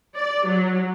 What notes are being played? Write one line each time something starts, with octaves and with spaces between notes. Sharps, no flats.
D5
F#3